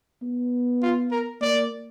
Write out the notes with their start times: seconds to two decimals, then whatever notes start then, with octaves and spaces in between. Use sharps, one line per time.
0.22 B3
0.82 F4
1.12 A#4
1.41 A#3 D5